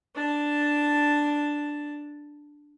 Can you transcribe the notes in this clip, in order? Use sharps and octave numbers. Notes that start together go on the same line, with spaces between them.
D4 A5